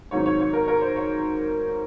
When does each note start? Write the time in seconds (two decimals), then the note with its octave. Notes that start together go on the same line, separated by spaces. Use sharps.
0.11 G#2 D#3 F#3 C4 C#5
0.26 C#5
0.40 C#5
0.53 A#4
0.68 A#4
0.81 C5
0.96 C#5